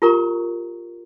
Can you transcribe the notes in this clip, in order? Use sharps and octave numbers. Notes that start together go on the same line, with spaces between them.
F4 G4 A#4 A#5 C#6